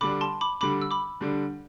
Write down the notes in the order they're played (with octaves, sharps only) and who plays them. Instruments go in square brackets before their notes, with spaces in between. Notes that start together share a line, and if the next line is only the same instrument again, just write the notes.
[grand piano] D3 G3 D4 [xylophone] B5 D6
[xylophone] A5 C6
B5 D6
[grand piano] D3 G3 D4 [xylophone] B5 D6
[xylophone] E6
B5 D6
[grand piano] D3 G3 D4